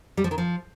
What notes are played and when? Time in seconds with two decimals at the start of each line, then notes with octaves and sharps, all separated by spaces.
0.17 G3
0.24 F3
0.31 D#3
0.38 F3